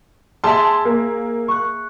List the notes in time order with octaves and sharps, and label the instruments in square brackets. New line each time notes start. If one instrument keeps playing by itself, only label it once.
[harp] G#4 E5 [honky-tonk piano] A5 C6
[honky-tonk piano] A#3
[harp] C#6 F#6